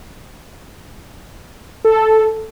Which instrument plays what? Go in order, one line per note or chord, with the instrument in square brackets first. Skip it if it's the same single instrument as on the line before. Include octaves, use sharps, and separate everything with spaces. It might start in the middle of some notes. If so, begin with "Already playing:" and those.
[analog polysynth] A4